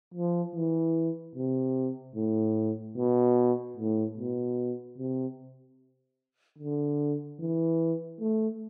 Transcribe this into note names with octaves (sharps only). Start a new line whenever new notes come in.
F3
E3
C3
A2
B2
A2
B2
C3
D3
E3
A3